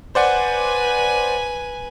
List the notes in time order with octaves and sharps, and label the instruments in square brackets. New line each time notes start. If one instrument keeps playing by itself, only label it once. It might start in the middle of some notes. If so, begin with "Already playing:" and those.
[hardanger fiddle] B4 G#5 [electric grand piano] C5 D5 F#5